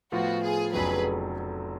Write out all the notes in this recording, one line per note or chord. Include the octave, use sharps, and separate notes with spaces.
A2 F3 B3 F4 F#4
G#4
F1 F2 C#3 F#3 B3 G#4 B4